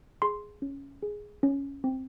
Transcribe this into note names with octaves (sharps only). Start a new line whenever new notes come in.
G#4 C6
C#4
G#4
C#4
C4